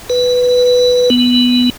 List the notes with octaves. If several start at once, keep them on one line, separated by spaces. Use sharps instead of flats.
B4
B3